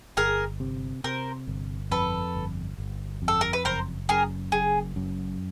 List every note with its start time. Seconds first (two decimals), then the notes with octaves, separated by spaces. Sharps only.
0.17 G1 G#4 A#4
0.60 C3
1.04 C3 A#4 C5
1.47 G1
1.91 F2 A4 B4
2.35 G1
2.78 G1
3.22 F2
3.28 A4
3.41 A#4
3.53 B4
3.65 F#1 A#4 C5
4.09 F#2 G#4 A#4
4.52 F#1 G#4
4.96 F#2